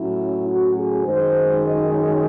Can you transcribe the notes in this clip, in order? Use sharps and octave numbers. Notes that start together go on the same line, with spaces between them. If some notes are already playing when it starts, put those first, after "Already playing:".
Already playing: A2 F#3 C#4 E4
F#4
G#4
F#2 D#3 G#3 C5
D#5
C#5